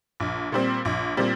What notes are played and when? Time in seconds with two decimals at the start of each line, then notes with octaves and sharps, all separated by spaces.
0.20 A#1
0.52 A#2 G3 C4
0.85 A#1
1.17 A#2 G3 C4